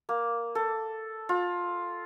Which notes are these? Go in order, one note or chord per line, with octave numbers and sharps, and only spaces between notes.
A#3
A4
F4